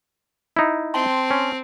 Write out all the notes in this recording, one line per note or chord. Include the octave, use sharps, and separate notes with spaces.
D#4 E4
C4 G5 A5 C6
C#4